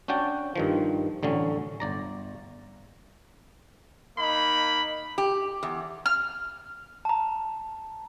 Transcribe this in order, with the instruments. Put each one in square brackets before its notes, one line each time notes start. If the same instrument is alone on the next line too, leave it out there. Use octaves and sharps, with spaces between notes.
[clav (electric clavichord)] C#4 D4 F#4 G5 A5
G2 D#3 F3
A1 D3 F#3 C#4
G1 D5 A#5
[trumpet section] A#3 D#4 B5
[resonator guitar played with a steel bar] G4
E2
[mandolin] F6
[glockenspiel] A5 A#5